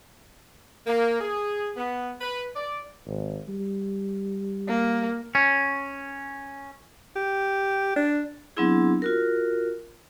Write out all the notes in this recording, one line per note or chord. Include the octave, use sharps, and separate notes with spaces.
A#3
G#4
B3
B4
D5
G#1
G3
A#3
C#4
G4
D4
F#3 B3 C4 D4 E4 G#4
F4 F#4 A#4